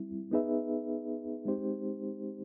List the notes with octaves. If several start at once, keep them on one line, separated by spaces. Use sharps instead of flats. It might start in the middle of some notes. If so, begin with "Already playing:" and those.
Already playing: G3 C4 E4
B3 D#4 G#4 B4 E5
G#3 C4 D#4 G4 C5